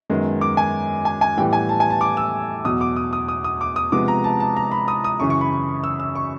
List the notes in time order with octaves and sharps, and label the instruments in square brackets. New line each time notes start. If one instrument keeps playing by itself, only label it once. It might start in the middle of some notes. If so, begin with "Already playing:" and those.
[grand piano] F#2 D#3 G#3 B3
D6
G#5
G#5
G#5
A2 E3 G3 B3 G5
G#5
A5
G#5
A5
D6
E6
E2 B2 F#3 D#6
D6
D#6
D#6
D#6
D#6
D6
D#6
C3 F3 G#3 B3 D6
A#5
A5
A5
A#5
B5
D#6
D#6
F#2 C#3 E3 C#6
C#6
B5
E6
E6
C#6